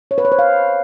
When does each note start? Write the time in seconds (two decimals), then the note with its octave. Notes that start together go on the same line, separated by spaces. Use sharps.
0.11 C#5
0.18 B4
0.25 C#5
0.32 C5
0.39 F5